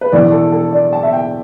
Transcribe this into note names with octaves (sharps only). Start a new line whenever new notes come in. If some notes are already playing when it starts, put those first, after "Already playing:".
B4
E1 E2 E3 D5
A4
A4
D5
A5
E5
G5